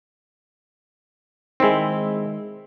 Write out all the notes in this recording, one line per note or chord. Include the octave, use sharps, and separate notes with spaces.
D#3 G#3 C4 E4